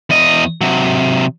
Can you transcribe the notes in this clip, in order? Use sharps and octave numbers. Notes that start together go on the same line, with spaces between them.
E2 D#5
C3 F#3